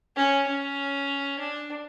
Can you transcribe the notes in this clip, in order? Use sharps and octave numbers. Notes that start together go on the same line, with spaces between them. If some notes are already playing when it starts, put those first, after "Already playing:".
C#4
C#4
D4